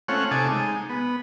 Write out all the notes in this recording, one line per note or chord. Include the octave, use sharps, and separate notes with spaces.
A3 C4 C#4 F4 C#5 F#5
C3 D#4 A4 G#5 A5 D6
G#3 D#4
B3